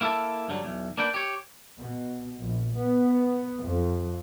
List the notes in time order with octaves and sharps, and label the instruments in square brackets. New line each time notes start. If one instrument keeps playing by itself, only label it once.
[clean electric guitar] A#3 E4 G4 A4 A5
G2 D3 F#3
B1 E2
A#3 D4 B4 G5
G4 C#5
[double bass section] B2
A#1
B3
F2